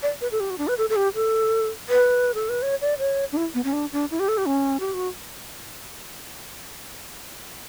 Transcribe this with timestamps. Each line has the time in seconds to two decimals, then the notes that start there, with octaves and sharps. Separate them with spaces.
0.03 D5
0.21 B4
0.31 A4
0.40 G4
0.50 F#4
0.58 D4
0.68 B4
0.78 A4
0.90 A4
0.96 G4
1.15 A4
1.89 B4
2.34 A4
2.49 B4
2.62 C#5
2.81 D5
2.99 C#5
3.32 D4
3.37 E4
3.54 B3
3.64 C#4
3.73 D4
3.92 D4
4.11 E4
4.20 G4
4.28 A4
4.38 G4
4.47 C#4
4.80 G4
4.94 F#4